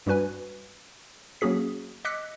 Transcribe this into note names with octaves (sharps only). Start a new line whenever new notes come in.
G2 G3 F#4 B4 G#5
F#3 A#3 C#4 F#4 G#4 B6
D#5 D6 E6 F#6 B6 C#7